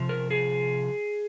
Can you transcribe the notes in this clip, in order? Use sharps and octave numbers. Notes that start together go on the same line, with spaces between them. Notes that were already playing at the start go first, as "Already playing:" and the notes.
Already playing: C3 F3
A#4
G#4